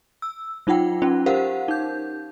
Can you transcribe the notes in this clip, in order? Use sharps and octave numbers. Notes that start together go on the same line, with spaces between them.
E6
F#3 D#4 F4 F#5 G5
C#4 D#4 F4
G4 A#4 C5 F5 F#5
D#4 G6